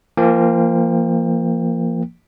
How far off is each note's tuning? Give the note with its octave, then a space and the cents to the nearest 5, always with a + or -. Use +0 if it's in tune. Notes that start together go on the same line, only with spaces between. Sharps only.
F3 -30 A#3 -10 G5 +20